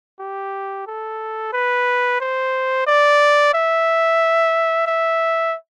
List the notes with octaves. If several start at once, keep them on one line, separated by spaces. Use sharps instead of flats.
G4
A4
B4
C5
D5
E5
E5